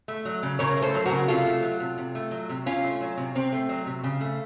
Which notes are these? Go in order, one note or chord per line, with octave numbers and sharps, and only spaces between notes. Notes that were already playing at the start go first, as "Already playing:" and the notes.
A3
F#3
C#3
C#3 A#4 C#5
A3
A4 C5
F#3
F#4 A#4
C#3
C3 F4 A4
A3
F#3
C3
C3
A3
F#3
C3
C3 C#4 F4
A3
F#3
C3
C3 C4
A3
F#3
C3
C#3
A3